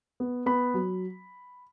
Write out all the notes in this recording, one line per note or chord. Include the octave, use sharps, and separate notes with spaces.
B3
B3 B5
F#3